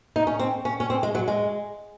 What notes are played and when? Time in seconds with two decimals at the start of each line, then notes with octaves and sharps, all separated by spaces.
0.16 D#4
0.27 C#4
0.39 C4
0.65 C#4
0.80 C#4
0.90 C4
1.03 G#3
1.15 F#3
1.28 G#3